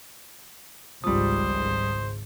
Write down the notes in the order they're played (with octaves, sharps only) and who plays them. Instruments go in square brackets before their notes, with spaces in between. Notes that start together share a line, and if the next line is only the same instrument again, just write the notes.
[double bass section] G#1 C#2 G#2 [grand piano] F3 G3 [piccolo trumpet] C5 [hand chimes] D#6